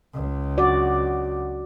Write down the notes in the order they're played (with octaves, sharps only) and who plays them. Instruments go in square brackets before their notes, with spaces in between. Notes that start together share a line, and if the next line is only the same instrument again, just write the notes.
[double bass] C#2
[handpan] F#4 D5